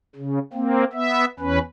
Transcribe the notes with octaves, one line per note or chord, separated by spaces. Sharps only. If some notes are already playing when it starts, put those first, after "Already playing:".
C#3
A#3 C4
B3 E5
E2 C#4 B4